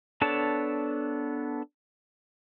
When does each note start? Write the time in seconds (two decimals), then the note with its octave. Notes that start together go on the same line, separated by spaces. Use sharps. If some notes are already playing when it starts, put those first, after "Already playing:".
0.21 B3 D4 A4 C#5 A5